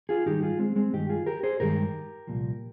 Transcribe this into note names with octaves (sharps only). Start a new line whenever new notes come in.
F4 G#4
G#2 D#3 G3 D#4 G4
F4 G#4
G#3 C4
G#3 C4
G2 D#3 G#3 D#4 G4
F4 G#4
G4 A#4
G#4 C5
G2 D#3 G#3 G4 A#4
C2 A#2 F3